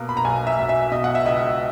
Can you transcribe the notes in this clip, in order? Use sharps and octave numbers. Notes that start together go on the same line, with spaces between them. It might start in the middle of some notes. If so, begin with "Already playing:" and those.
Already playing: B2 A#3
B5
A#5
B1 G#5
E5
B1
E5
B2 D#5
F#5
E5
C#2 D#5